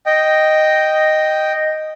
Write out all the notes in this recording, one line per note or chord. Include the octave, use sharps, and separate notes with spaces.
D#5 G5